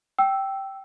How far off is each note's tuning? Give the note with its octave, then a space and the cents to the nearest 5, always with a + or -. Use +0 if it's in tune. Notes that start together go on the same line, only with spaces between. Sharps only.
G5 -10 E6 +0